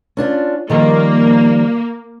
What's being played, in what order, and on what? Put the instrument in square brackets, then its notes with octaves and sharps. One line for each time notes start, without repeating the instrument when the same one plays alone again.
[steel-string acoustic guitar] C#4 D4 F4
[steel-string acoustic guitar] D#3 F3 G3 [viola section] A#3